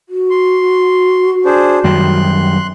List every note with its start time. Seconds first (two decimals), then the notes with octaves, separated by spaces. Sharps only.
0.09 F#4
0.30 C6
1.45 D4 G#4 C5
1.84 F#2 D#3 G3 C6 F#6